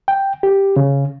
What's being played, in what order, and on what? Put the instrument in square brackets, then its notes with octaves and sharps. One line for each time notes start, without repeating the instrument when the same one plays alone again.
[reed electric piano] G5
G4
C#3